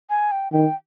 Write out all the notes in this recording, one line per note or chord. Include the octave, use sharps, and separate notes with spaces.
G#5
G5
D#3 G5